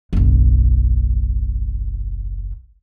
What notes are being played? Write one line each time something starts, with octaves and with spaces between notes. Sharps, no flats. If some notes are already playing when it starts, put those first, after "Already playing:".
F#1 B1